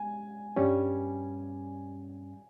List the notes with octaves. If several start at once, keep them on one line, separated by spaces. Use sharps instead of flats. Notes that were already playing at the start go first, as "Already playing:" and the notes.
Already playing: G#3 G#5
G2 G3 C#4